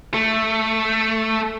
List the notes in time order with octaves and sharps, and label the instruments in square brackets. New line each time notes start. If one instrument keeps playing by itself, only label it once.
[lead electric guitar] A3